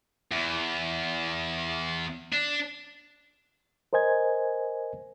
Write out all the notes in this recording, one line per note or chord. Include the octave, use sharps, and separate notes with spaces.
E2
D4
A#4 C5 D#5 G#5 G#6